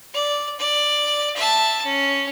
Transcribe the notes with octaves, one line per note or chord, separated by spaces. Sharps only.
D5
D5
E5 A5
C#4